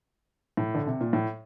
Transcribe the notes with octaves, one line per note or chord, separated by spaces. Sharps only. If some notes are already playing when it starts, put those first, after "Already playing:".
A2
D3
C3
A#2
A2